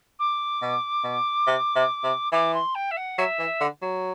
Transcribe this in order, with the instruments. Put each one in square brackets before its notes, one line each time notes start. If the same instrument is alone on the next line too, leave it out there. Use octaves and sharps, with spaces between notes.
[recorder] D6
[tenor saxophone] B2
B2
C3
C3
C3
[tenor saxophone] E3 [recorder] D6
[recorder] C6
G5
E5
F#5
[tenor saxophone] F#3 [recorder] E5
[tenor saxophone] E3
D3
F#3